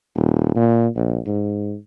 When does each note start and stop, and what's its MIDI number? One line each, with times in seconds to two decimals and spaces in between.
0.15 0.51 27
0.56 0.88 46
0.96 1.19 34
1.26 1.75 44